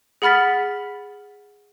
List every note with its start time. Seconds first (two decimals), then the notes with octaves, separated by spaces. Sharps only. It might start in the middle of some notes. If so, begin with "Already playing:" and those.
0.22 G#4 F#5 B5 F6 A6 B6